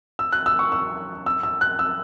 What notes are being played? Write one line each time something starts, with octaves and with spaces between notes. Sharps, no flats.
E6
F#6
E6
C#6
E6
E6
E6
F#6
E6